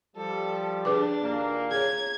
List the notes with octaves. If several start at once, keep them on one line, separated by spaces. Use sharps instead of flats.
F3 G3 A4
D4 G#4 B4 D6
D#2 A#2 A#3
G#4 C#5 G#6